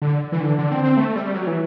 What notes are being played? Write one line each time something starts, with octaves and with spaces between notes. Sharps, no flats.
D3
E3
D3
D3
C4
C4
A3
G3
F#3
E3